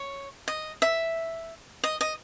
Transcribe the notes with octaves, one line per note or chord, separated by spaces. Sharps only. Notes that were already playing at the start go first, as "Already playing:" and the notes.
Already playing: C#5
D#5
E5
D#5
D#5